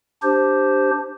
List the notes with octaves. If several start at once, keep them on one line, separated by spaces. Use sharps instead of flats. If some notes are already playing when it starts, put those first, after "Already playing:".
D4 G4 C5